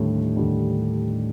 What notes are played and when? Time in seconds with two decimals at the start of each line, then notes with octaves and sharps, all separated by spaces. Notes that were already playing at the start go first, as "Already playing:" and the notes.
Already playing: D#2 A2 D3 G3 D4
0.36 D#2 D3 G3 D4